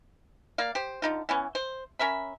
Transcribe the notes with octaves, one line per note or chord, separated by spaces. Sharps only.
A#3 D5 F5
G4 C5
D3 D#4 F4
E3 B3 C#4
C5
C#4 A#4 E5 B5